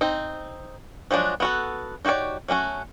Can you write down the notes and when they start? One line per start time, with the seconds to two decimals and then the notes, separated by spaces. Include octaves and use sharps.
0.01 C4 D#4
1.11 F3 F#3 G#3 D4 F#4
1.40 B3 F#4 A4
2.05 D#4 F#4 G4 C#5 D5
2.48 F#3 A3 C#4 F#4